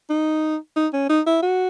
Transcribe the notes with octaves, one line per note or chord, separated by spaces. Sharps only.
D#4
D#4
C#4
D#4
E4
F#4